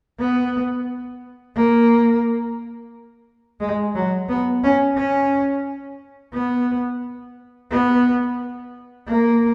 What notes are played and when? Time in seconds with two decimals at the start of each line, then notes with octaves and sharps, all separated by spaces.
0.19 B3
1.56 A#3
3.61 G#3
3.96 F#3
4.29 B3
4.64 C#4
4.97 C#4
6.34 B3
7.71 B3
9.08 A#3